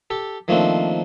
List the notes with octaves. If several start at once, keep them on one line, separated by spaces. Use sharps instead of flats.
G4 A4
D#3 F3 A3 A#3 C4 D4